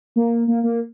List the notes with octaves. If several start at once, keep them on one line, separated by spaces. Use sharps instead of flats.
A#3
A#3
A#3